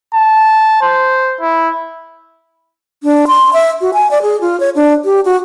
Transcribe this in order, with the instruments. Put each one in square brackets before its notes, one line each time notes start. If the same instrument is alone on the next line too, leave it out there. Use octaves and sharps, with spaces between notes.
[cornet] A5
C5
E4
[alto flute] D4
C6
E5
F#4
G#5
D5
G#4
F4
C#5
D4
G4
F#4